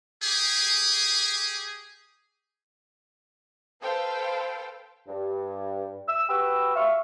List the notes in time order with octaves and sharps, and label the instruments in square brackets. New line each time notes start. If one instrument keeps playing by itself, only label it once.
[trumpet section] G4 G#4
[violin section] A4 B4 C5 F5 G5
[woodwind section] G2
E6
F#4 G4 B4 B5 C#6 E6
E5 F5 C#6